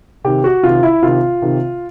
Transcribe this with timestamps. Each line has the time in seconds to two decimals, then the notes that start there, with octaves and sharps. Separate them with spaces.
0.24 C3 D#3 G4
0.44 F#4
0.63 C3 D#3 F4
0.83 E4
1.03 C3 D#3 F4
1.42 C3 D#3